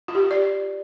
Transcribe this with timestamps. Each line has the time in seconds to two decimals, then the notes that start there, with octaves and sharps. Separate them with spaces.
0.08 F4
0.15 G4
0.31 D5